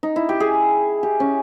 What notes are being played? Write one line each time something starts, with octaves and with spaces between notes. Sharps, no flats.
D#4
E4
G4
G#4
G4
C#4